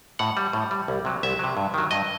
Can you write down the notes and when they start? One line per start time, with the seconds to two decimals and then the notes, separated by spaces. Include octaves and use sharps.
0.19 A2 F#5
0.37 G3
0.53 A2
0.71 G3
0.88 C2
1.05 C3 F#3
1.23 C2 E5
1.39 C3 F#3
1.57 G2
1.74 D#3 F#3
1.91 G2 D#5